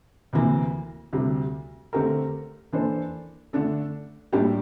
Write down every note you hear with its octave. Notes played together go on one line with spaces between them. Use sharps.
D2 C3 E3 A#3
D2 C3 G3
D3 A3 C4 G4 A#4
E3 A#3 D4 A4 C5
D3 A3 D4 A4
A2 G3 A#3 D4 G4